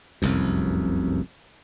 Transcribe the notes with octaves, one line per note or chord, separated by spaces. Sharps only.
F1 C2 F#2